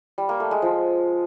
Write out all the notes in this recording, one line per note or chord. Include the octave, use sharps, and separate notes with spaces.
G3
A#3
A3
G#3
F3